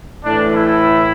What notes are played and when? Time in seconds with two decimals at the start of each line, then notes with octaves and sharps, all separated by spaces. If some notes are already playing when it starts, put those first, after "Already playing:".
0.24 A2 E3 D4
0.54 E4